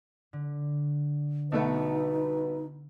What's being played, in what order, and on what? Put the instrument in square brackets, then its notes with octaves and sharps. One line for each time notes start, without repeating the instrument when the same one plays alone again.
[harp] D3
[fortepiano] B1 A3 B3 [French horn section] G3 F#4 B4 [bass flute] D#4